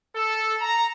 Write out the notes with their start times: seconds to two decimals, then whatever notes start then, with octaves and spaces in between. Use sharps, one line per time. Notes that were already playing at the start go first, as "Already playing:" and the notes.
0.14 A4
0.61 A#5